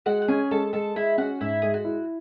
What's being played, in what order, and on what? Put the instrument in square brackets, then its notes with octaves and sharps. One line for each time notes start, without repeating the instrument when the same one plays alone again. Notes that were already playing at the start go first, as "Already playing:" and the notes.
[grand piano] G#3 [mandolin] F#4 F#5
[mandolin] F#5
[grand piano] C#4 [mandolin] G#4 G#5
[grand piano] G#3 [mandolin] A4 A5
[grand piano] G#3 [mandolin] A4 A5
[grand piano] G#3 [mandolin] E4 E5
[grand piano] C#4 [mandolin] F#4 F#5
[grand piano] G#2 [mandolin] E4 E5
[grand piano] G#3 [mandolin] G#4
[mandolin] F#4
[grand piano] E4